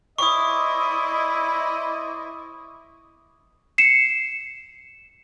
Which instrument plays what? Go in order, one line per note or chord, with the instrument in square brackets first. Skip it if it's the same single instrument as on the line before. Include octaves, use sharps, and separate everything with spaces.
[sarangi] E4 [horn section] C5 D5 D#5 [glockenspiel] C#6 D#6
[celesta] C7 C#7 E7